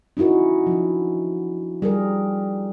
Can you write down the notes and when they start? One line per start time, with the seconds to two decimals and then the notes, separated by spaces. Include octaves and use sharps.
0.17 C#4 D#4 E4 F#4 A#4
0.67 F3 D4
1.82 G3 G#4 A#4